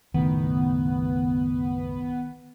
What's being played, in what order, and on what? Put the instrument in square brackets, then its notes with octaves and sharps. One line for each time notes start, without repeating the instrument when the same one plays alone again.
[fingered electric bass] F#1 B1 A2 [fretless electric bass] D#3 [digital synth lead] B3